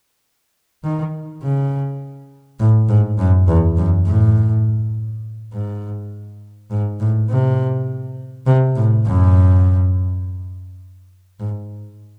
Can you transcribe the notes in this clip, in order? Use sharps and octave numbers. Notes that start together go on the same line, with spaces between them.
D#3
C#3
A2
G#2
F#2
E2
F#2
A2
G#2
G#2
A2
C3
C3
A2
F#2
G#2